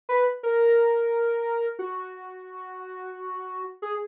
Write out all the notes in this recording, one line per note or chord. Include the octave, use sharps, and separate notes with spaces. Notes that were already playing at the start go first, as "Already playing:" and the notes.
B4
A#4
F#4
G#4